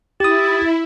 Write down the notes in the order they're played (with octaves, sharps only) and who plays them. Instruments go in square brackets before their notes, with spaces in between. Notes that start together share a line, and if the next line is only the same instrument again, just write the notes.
[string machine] E4 [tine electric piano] G4 D#6 [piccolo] A6